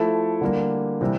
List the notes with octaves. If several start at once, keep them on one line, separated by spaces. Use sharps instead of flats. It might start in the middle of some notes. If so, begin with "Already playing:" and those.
Already playing: F3 A3 E4 A4
D3 G3 A#3
C3 E3 G3